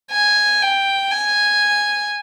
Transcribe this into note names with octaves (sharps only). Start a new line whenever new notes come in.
G#5
G5
G#5